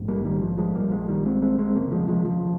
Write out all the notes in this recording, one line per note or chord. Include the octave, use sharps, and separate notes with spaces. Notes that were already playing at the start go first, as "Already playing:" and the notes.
Already playing: A#1 G#2
G3 A#3
D#3 G3
F3
F3 G#3
A#1 A#2 G3 A#3
F3 G#3
D#3 G3
G#3 C4
G#3 C4
G#3 C4
F1 D#2 C#3 A#3
F3 G#3
F3 G#3
F3